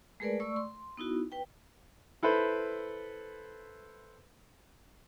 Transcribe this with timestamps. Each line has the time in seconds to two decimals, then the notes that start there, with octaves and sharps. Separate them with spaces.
0.20 G#3 A3 G#4 A#4 B4 D5
0.40 A3 D5 C#6 E6
0.56 C6
0.97 B3 D#4 E4 F#4
1.32 B4 G5
2.23 E4 A4 B4 C5